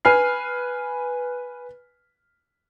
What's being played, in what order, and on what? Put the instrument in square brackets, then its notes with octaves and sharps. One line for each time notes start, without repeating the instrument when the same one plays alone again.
[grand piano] B4 G#5 F6 C7